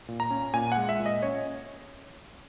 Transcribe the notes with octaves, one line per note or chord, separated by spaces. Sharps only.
A#2
A#5
C#4
A#2 G#5
F#5
G#3
E5
A#2
D#5
C#4 C#5